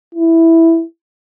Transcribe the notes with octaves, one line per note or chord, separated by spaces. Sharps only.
E4